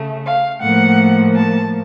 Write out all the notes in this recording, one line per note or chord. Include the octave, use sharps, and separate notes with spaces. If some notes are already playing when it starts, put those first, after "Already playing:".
Already playing: C#3 A3
F5
A2 F3 A#3 F#5
A5